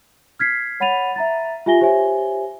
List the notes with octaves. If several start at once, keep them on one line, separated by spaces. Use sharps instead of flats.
F6 G#6 B6 C7
C#5 F#5 B5 A6 D#7 F7
E5 A#5 A6
F4 G4 E5 G#5 A#6 G7
G4 C5 C#5 E5 G#5